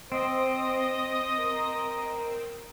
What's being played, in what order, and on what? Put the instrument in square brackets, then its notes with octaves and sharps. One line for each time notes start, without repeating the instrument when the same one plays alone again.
[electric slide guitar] C4 [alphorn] C5 [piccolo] D#5
[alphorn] A#4